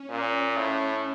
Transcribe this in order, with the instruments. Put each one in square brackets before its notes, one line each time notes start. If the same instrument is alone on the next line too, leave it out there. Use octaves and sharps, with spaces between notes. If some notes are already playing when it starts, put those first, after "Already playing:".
Already playing: [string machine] C#4
[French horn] A#2
A2